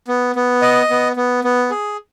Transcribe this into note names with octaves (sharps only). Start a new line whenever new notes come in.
B3
B3
D#5
B3
B3
B3
G#4